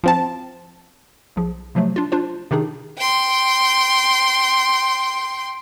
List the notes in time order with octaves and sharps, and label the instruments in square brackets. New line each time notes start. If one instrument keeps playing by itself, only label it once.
[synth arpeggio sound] F3 C4 A5
[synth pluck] B1 F3 G#4
C3 F3 F#3 A3
D4 F4
D4 F4 C5
C3 D#3 D4 D#4 G#4
[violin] G5 C6